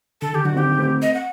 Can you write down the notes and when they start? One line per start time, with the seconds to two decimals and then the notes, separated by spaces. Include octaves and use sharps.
0.21 D3 A4
0.33 D#3 G4
0.45 D3 F#3 F#4
0.56 C4 D#4 G4
0.79 A3 C4
1.02 D#5
1.14 F#5